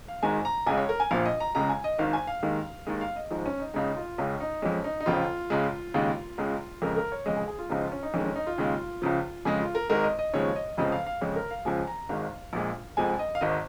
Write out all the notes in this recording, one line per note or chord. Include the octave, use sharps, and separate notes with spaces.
F5
G#1 G#2 D#3 G#3 G#5
A#5
C#2 C#3 G#3 G#5
C#5
A#4
G#5
A#1 A#2 F3 F5
D#5
A#5
C#2 C#3 G#3 A#5
G#5
D#5
G#1 G#2 D#3 F5
G#5
F5
D#2 D#3 G#3
D#2 D#3 G#3 D#5
F5
D#5
G#1 G#2 F3 G#3
C#4
D#4
C#2 C#3 G#3 D#4
F4
C#2 C#3 G#3 C#4
D#4
F2 F3 G#3 C#4
D#4
D#4
F1 F2 C#3 F3 F4
C#2 C#3 G#3
D#2 C#3 G#3
C#2 C#3 G#3
F2 C#3 G#3 A#4
A#4
C#5
F2 C#3 G#3 D#5
G#4
G#4
F4
C#2 C#3 F3 G#3 D#4
F4
C#4
D#4
F2 D#3 G#3 C#4
C#4
D#4
F4
D#2 C#3 G#3
C#2 C#3 F3
F2 C#3 G#3 G#4
F4
A#4
G#1 G#2 G#3 A#4
D#5
D#5
D#2 C#3 F3 G#3 C#5
D#5
F1 F2 C#3 F3 G#3 D#5
F5
F5
F2 C#3 G#3 C#5
A#4
F5
C#2 C#3 F3 G#3 G#5
A#5
G#1 G#2 D#3 G#3 F5
A#1 A#2 G#3
F1 F2 F3 G#3 G#5
D#5
F5
G#1 G#2 D#3 D#5